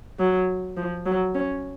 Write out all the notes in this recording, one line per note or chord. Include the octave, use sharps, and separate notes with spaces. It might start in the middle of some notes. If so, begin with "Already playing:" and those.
F#3
F3
F#3
C#4